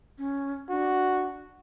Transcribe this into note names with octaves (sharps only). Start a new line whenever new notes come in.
C#4
D4 F#4